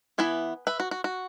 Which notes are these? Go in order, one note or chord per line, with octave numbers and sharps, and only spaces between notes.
E3 B3 E4 G#5
B4 E5
F#4
F#4
F#4